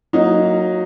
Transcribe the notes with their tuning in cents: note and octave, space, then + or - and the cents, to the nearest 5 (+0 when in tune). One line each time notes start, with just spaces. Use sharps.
F#3 -15 A#3 -20 D#4 +0